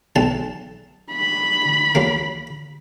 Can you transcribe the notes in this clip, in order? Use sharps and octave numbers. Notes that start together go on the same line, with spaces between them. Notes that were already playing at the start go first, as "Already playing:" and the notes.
B1 A5
B5
F#3 A#3